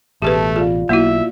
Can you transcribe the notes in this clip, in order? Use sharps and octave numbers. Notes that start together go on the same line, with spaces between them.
A1 B2 A3 G4 G#4 B4 A5
F4 G#4 D5 F5
B1 A#3 E4 F#4 E5